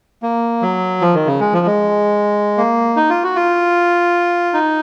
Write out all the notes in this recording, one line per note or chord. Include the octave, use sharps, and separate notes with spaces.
A#3
F#3
F3
D#3
C#3
G#3
F3
G#3
A#3
D#4
F4
F#4
F4
D#4